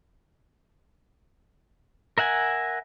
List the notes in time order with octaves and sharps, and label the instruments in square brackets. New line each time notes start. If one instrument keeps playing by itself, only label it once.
[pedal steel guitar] A#4 E5 F#5 G#5